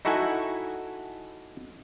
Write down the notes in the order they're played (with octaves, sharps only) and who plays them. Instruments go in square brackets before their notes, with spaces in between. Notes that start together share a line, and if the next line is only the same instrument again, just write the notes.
[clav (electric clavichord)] D#4 E4 F#4 A4 F#5 G#5